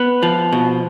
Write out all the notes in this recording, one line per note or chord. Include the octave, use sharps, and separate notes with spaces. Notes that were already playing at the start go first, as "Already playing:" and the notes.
Already playing: B3
F3
B2